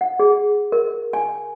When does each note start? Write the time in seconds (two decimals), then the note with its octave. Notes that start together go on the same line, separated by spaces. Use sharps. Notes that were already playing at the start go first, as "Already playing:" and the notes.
0.01 F#5
0.19 G#4
0.72 A#4
1.13 G#5